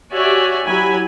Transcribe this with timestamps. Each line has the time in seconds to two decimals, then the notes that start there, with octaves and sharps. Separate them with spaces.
0.13 F#4 G4 C#5 D5 E5 G#5
0.67 F#3 E4 G4 G#5 B5